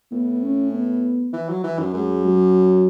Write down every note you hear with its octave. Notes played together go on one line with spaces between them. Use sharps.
A2 B3
C#4
B3
E3
F#3
E3
F#2
F#2 G#3
F#3